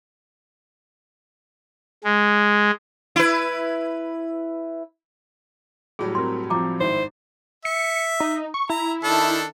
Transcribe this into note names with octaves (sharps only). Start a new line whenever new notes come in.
G#3
E4 B4
A2 F#3 G3 G#4
C4 A#4 C6
F3 C4 A#5 D6
G#1 E4 C5
E5 C#7
D#4
C#6
E4 A#5
D#3 D4 A4